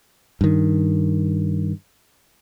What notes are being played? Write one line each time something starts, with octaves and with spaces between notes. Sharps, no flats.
G2 D#3